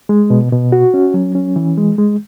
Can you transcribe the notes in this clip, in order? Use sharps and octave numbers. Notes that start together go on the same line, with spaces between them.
G#3
B2
B2
F#4
C#4
F#3
C#4
E3
G#3
G#3